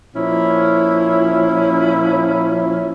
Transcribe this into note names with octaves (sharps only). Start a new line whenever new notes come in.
A#2 F3 C#4 E4